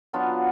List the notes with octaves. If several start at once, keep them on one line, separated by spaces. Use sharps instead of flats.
F#3 B3 D4 F4